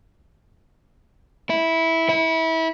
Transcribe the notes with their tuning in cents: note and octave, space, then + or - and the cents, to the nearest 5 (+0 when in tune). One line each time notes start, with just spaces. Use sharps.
E4 -10
E4 -25